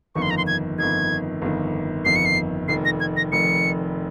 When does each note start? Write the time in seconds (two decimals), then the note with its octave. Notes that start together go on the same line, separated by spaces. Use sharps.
0.15 G1 F2 D#3 C#6
0.22 C6
0.30 A#5
0.37 C6
0.47 G#6
0.78 G1 F2 D#3 G#6
1.42 G1 F2 D#3
2.05 G1 F2 D#3 C7
2.16 C#7
2.25 C7
2.68 F1 F2 D#3 C7
2.85 A#6
3.00 G#6
3.17 A#6
3.32 F1 F2 D#3 C#7